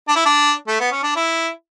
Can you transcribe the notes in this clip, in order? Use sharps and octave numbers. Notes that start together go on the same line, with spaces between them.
D4
E4
D4
A3
B3
C#4
D4
E4